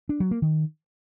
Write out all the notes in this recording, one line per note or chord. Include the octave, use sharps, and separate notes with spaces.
D4
F#3
A#3
D#3